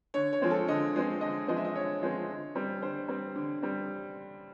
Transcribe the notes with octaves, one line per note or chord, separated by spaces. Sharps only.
D3 C#5
C#5
F3 G#3 C4
A4
D3 D#5
F3 G#3 C4
D3 D#5
F3 G#3 C4 D#5
E5
D#5
D3 C#5
F3 G#3 C4
D3
G3 C4
D3 C5
G3 C4
D3
G3 C4